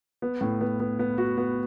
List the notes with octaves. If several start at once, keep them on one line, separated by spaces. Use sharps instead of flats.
B3
A2
B3
B3
B3
F#4
B3